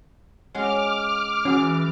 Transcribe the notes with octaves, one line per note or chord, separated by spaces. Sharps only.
G#3 C#4 F#4 D6 F6
E3 C#4 F#4 G#4